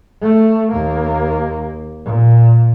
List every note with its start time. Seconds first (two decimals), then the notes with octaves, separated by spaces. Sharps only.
0.22 A3
0.72 D#2 A#3
2.05 A#2